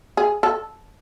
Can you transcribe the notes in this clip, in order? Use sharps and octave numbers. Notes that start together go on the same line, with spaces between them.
G#4
A4